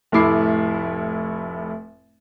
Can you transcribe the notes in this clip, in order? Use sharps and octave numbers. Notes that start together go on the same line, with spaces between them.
F1 A2 A3 E4 D6 C7